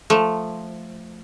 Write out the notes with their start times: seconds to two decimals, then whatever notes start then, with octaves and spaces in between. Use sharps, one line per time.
0.10 F3 A3